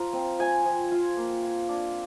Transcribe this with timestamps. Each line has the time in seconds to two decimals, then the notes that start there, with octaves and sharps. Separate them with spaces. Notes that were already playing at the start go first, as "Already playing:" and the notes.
Already playing: F3 F4 A#5
0.13 C4
0.39 F3 G#5
0.65 F3
0.92 F4
1.16 A#3
1.42 F4
1.69 D4